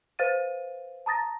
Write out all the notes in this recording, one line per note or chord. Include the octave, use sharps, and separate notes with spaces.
B4 C5 F5 A6 D#7
A5 A#5 D#6 A6 A#6